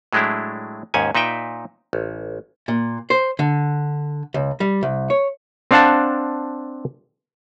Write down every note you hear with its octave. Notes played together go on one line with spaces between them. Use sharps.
A2 F#3 G#3 A3 D4 E4
D#2 G#2 C#4 G#5
A#2 D#4 B4 E5 G5
A1
A#2
C5
D3
C#2
G3
C2
C#5
C4 D4 F5 F#5 A5